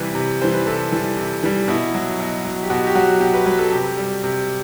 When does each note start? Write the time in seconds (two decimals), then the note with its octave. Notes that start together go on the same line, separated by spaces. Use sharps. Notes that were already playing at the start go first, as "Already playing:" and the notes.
Already playing: C3 E3 G3 B4
0.15 C3
0.41 E3 G3 C5
0.54 B4
0.67 C3 A4
0.92 E3 G3
1.17 C3
1.43 E3 G3
1.68 B2 E4
1.94 F#3
2.20 B2
2.45 F#3
2.63 G4
2.70 B2 F#4
2.87 G4
2.95 F#3 F#4
3.21 B2 G4
3.34 B4
3.46 F#3 B4
3.59 A4
3.72 C3 G4
3.97 G3
4.24 C3